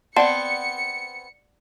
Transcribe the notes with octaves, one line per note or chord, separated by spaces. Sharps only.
B3 C4 D5 F#5 A5 C#7